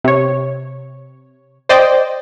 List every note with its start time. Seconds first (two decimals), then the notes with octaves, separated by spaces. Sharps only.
0.04 C3 C#5
1.69 C5 D5 D#5 G5